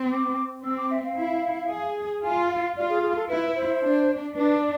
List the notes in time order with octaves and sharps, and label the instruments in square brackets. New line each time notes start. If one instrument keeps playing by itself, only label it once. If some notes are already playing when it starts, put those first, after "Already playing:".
Already playing: [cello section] C4
[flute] D6
[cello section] C4 [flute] E6
[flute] D6
E5
F5
[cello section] E4
G#4
[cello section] F4 [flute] G#5
[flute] F5
[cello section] F4 [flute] D5
[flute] G#4
G#4
A4
[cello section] E4 [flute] B4
[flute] C5
[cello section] D4
[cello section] D4 [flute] B4
[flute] D5